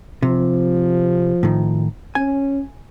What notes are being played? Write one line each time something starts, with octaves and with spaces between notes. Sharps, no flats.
C3 F3
A2 D#3
C#4 G#5